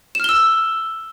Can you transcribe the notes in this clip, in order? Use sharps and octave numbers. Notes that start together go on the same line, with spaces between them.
E6 F6 E7 G7